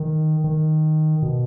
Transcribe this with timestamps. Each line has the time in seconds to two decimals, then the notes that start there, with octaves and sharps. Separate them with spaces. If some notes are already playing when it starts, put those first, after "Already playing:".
Already playing: D#3
0.44 D#3
1.22 B2